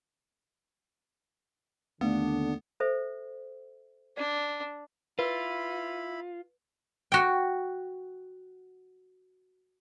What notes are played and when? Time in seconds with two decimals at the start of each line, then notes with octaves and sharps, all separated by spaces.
2.01 D#2 D3 A3 B3 D4
2.80 A4 C5 E5
4.17 D4 D5
5.19 E4 F4 B4 B5
7.12 F#4 G5